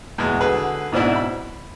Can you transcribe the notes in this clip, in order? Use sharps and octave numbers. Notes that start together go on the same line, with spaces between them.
E2 B2 G#3
D3 F#4 G#4 B4
G#2 B2 C4 D4 E4
B5